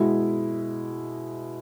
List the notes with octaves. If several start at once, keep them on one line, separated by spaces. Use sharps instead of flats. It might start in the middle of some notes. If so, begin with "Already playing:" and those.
Already playing: B2 G#3 E4